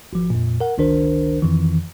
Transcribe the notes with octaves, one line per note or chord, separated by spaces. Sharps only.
G#1 F3
F2 A#2
A#4 F#5
G1 C#2 D#3 D4 A#4 C5
F2 D#3 E3